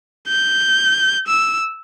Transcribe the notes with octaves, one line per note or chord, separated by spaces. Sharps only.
G6
E6